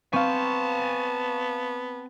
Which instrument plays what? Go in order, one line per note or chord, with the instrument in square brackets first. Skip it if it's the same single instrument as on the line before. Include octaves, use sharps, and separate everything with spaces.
[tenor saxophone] B3 [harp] C4 [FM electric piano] F5 C#6 [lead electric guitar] G#5 A5